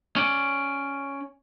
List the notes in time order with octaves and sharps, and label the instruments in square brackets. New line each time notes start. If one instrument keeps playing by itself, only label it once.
[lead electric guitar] C#4 D5